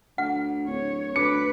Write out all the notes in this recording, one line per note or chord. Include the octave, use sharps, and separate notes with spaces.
D2 F#5
D1 C#5
D2 B4 D6 C#7